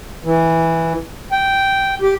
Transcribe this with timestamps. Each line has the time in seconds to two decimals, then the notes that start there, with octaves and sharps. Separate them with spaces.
0.24 E3
1.32 G5
2.02 G4